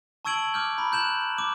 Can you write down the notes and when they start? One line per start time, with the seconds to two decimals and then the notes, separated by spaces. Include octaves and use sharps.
0.25 A5 C#6 E6 G#6 D7 F#7
0.54 D6 F6 G6
0.78 A#5 B5
0.92 F#6 G6 E7 F#7
1.38 D6